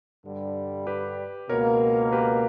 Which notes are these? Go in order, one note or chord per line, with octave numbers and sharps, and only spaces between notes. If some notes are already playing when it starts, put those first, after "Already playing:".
G2 D3 G3
G4 B4
C#2 B2 A#3 A#4 C#5
G4 B4